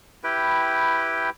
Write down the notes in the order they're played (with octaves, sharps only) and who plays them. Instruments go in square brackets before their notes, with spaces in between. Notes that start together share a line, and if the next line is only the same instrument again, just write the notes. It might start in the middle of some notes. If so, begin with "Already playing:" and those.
[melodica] E4 G4 B4 G5